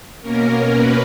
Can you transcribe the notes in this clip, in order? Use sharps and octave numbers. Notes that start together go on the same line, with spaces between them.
B2 A#3 C#4 A#4
B4